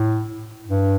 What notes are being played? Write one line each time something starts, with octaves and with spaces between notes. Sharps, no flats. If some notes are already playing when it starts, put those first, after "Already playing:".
Already playing: A2
G2